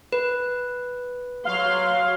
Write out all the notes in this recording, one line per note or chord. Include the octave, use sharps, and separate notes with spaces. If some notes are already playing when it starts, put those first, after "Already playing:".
B4
F#3 F5 C6